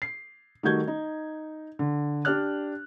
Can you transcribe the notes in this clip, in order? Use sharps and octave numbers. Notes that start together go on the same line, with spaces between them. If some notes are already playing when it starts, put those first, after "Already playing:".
C7
D#3 G3 A3 F#4 G6 G#6
D#4
D3
D4 G4 D5 F6 F#6